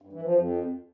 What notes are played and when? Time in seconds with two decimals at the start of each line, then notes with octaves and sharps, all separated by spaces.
0.02 G2
0.13 E3
0.24 F3
0.35 F2